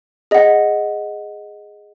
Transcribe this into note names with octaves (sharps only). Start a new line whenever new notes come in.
G#4 D#5 F#5